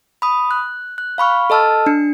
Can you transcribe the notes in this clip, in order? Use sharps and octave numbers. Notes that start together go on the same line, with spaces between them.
B5 D#6
F#6
F#6
F5 B5 C#6 F6
A4 D#5 A5 E6 F6
D4 C#7